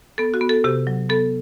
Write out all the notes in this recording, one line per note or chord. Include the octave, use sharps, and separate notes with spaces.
B3 A4
F#4
B3
A4
C3 G4
F#3
B3 A4